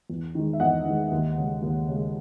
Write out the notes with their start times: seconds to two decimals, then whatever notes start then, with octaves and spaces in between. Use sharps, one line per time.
0.10 E2
0.35 D#3 G#3
0.53 E5
0.60 E2 D#5 F#5
0.85 D#3 G#3
1.12 D#2
1.38 C#3 G#3
1.62 D#2
1.88 C#3 G#3